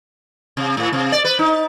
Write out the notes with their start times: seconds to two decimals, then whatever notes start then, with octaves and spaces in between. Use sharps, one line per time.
0.57 C3
0.77 A2
0.93 C3
1.12 D5
1.24 B4
1.39 D#4